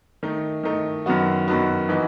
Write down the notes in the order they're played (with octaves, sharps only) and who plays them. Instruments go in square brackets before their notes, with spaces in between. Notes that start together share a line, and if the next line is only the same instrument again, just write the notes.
[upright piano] D#3 A3 D#4
D#3 A3 D#4
F#2 D#3 F#3 B3 F#4
F#2 D#3 F#3 B3 F#4
E3 B3 D#4 F#4 B4